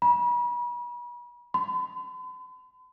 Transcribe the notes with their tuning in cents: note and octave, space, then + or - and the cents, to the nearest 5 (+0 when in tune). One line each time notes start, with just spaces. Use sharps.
B5 -40
B5 +45